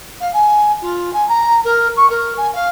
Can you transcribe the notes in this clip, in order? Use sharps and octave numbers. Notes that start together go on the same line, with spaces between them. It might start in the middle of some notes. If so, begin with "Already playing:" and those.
F5
G#5
F4
G#5
A#5
A#4
C#6
A#4
G#5
F5